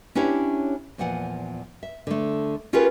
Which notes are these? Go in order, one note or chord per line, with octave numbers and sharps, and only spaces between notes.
C#4 D4 E4 G4 C#5 D5
E2 A#2 F3 F#5 G#5
E5
D3 A3
C#4 F4 G4 G#4 A#4 B4